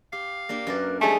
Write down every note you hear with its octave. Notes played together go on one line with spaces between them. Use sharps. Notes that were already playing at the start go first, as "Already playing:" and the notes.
G4 F5
A#3 D4 G4
F#2 A#4 B4 D5
F3 G3 A3 D#4 G#4 G#5